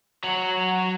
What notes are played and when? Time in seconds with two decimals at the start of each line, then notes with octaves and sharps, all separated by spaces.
0.23 F#3 F#4